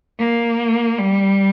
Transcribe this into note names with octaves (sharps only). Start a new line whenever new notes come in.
A#3
G3